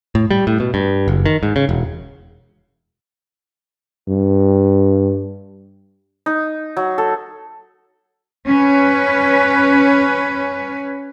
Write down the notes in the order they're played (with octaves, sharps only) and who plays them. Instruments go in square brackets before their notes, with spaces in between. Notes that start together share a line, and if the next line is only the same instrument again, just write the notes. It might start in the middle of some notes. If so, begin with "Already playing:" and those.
[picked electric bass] A2
G3
A2
B2
G2
F#1
D#3
G#2
C#3
E1
[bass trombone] G2
[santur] D#4
F#3
A4
[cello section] C#4 B4